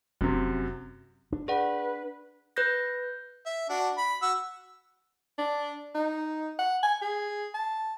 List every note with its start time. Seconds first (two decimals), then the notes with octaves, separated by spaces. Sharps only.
0.21 F1 F#2 C3
1.33 D4
1.48 G#4 B4 D5 F#5
2.56 B4 F#6 G6 A#6
3.46 E5
3.70 D4 F#4
3.98 B5
4.22 F#4 E6
5.38 D4
5.95 D#4
6.59 F#5
6.83 G#5
7.02 G#4
7.54 A5